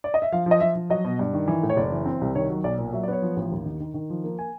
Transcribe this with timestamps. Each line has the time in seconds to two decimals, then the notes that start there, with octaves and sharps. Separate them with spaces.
0.04 D5
0.14 D#5
0.22 E5
0.32 F3 F5
0.46 F3
0.51 D#5
0.60 F3 E5
0.75 F3
0.90 F#3 D#5
1.04 B2
1.19 G2
1.34 D#3
1.48 E3
1.63 A2
1.70 C#5
1.77 F#1 D5
1.92 E3
2.06 C4
2.21 C2
2.35 D#3 C#5
2.50 F#3
2.64 B1 D5
2.78 A#2
2.93 F#3 E5
3.03 D5
3.08 B3 C#5
3.22 F3
3.36 A1
3.52 D#2
3.65 D#3
3.80 D#3
3.94 D#3
4.10 F3
4.24 A#3
4.39 G#5